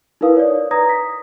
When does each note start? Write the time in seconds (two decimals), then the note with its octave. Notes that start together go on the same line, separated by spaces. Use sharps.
0.21 D#4 E4 A#4 B4 F5 D#6
0.37 C#5 D5
0.71 B4 A#5 D#6 G#6 A#6
0.89 B6